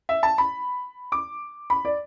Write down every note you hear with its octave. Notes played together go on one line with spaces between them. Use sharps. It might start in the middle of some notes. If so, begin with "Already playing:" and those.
E5
A5
B5
D6
B5
D5